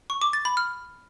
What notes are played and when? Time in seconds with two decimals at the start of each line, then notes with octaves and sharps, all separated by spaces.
0.10 C#6
0.22 D6
0.33 A6
0.45 B5
0.57 F6